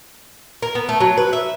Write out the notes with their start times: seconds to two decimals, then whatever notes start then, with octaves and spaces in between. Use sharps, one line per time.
0.62 A#4
0.75 B3
0.89 A3
1.00 F#3
1.17 B4
1.33 E5